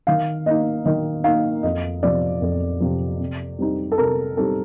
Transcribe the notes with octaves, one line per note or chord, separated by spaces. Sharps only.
D#3 F5
A#3 D#4 D#5
D#3 D#5
A#3 D#4 F5
F2 D#5
C3 F3 D5
F2
C3 F3
C3
G3 C4 D#4
A4
C3 A#4
G3 C4 D#4 A4